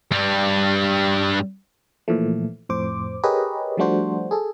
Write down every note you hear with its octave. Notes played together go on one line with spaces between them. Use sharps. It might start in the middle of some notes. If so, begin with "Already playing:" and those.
G2 G3
A#2 E3 F3 A3
F2 A2 C5 D6
G4 G#4 A#4 B4 C#5 D#5
F3 G3 A3 D4 F#4 C5
G#4 A4